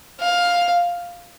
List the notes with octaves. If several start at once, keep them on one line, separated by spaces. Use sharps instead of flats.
F5